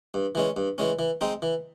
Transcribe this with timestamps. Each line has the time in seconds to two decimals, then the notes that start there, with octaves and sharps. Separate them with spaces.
0.14 G2
0.35 E3 G#3 C#4
0.57 G2
0.78 E3 G#3 C#4
0.99 E3
1.21 G#3 C4 D#4
1.42 E3